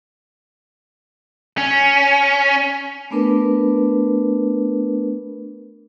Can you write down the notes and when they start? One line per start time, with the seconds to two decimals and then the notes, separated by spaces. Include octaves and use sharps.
1.58 C#4
3.11 A3 B3 D4 A#4 B4